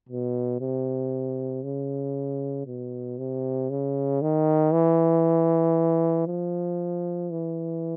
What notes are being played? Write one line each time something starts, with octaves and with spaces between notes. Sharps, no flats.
B2
C3
C#3
B2
C3
C#3
D#3
E3
F3
E3